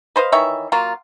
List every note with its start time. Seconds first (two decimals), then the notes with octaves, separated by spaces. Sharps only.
0.16 B4 C5 D#5 F5
0.32 D#3 E3 C#5 E5
0.72 F#3 A#3 F4